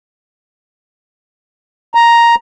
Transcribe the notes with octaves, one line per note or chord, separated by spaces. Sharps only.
A#5